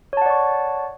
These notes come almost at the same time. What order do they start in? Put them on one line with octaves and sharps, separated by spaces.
C#5 A5 F#5 D5 C#6